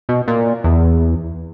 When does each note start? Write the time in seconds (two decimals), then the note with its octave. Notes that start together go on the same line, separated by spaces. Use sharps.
0.09 B2
0.28 A#2
0.64 E2